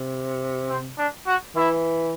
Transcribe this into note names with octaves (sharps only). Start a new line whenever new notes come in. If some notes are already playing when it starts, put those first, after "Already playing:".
Already playing: C3
C4
D4
F#4
E3 E4